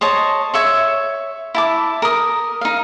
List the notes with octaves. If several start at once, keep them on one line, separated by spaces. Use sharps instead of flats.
C5 C#5 D#5 A5
C#5 E5 C#6
E4 A5 D6
A#4 D#6
D#4 F5